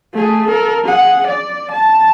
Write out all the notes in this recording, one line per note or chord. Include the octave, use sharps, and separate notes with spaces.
A3 G#4
A4 A#4
G#4 F#5
D5
A5